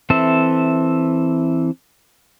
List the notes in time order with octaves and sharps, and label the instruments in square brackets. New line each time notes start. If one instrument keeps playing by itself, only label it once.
[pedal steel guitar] E3 C4 A4 E5